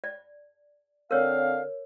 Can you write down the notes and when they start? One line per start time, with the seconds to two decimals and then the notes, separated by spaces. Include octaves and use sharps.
0.04 D5
1.11 D3 C4 A#4 C#5 F5